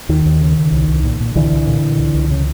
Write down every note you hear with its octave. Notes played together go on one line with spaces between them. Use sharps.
D#2 D#3
D#2
C#3
C#3
C2
C2
A#2
A#2
C2 D3 E3
C2
A#2
A#2
C#2
C#2
C#3